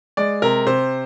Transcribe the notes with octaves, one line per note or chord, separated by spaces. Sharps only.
G#3 D5
C3 A#4
C3 C5